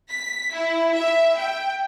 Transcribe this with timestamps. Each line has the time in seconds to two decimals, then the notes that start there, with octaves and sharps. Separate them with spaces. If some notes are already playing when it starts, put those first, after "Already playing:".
0.10 B6
0.55 E4
0.95 E5
1.37 G5